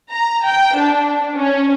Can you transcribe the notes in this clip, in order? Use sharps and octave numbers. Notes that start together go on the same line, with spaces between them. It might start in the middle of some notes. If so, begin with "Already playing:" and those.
A#5
G5
D4
C#4